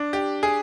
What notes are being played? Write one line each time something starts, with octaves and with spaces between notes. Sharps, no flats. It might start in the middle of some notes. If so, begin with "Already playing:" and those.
Already playing: D4
G4
G#4